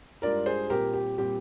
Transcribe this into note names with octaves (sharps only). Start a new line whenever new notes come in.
G#2 G3 D4 F4 A#4 D5
G#4 C5
A#2 G3 C4 G4 A#4
G4
A#2 G3 C4 G4